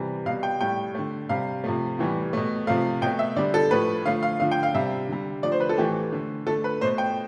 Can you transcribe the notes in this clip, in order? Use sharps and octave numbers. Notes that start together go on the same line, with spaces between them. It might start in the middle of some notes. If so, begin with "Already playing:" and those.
Already playing: C3 E3 G3
B2 G3 F5
G5
A2 G3 G5
D3 A3
C3 G3 F5
C3 F3 A3
A2 E3 G3
B2 A3
C3 F3 A3 F5
B2 A3 G5
E5
D3 G3 D5
A4
A2 F3 A3 B4
D3 F3 A3 F5
F5
D3 F3 A3 F5
G5
F5
C3 G3 E5
D3 G3
D3 F3 A3 D5
C5
B4
A4
A2 E3 A3 G4
D3 A3
D3 A3 A4
B4
B2 A3 C5
G5